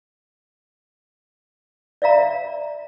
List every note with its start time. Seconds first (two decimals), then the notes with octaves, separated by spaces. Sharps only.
2.02 D5 E5 F5 A#5